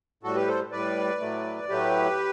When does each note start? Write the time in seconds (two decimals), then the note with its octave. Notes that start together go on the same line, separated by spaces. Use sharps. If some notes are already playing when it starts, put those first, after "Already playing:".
0.23 A2 G3 F#4 A4
0.36 G4 B4
0.47 A4 C5
0.72 A2 G3 B4 D5
1.20 A2 F#3 A3
1.69 A2 F#3 A3 G4 B4